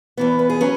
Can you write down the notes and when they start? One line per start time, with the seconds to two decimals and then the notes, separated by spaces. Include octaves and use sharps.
0.17 E2 E3 B3
0.39 B4
0.50 G#4
0.61 F#3 C#4 B4